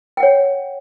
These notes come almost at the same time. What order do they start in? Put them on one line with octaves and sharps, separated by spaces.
G5 F#5 C#5